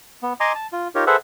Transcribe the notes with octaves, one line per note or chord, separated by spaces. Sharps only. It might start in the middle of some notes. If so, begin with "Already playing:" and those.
B3
D#5 G#5 A#5 C6 D6 D#6
A5
F4
D#4 F4 G4 A#4 C#5
G#4 A4 B4 C5 E5 F#5